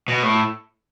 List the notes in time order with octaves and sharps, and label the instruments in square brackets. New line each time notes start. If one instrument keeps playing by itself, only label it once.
[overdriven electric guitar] B2
A2